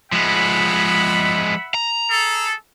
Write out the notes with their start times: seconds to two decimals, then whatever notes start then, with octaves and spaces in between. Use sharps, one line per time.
0.12 F3 G#3 E5 F#5 B5
1.74 A#5
2.10 G#4 A4